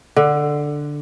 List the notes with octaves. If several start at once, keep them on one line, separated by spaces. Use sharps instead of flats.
D3